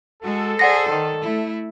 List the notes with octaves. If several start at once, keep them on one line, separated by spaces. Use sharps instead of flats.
G#3 F#4 A4
G#4 C5 D5 F#5 A#6
D#3
A3 E4